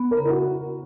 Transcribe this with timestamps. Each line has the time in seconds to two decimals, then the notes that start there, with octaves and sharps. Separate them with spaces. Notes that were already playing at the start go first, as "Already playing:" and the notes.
Already playing: B3
0.11 A#4
0.17 C#3
0.25 E4
0.30 F#4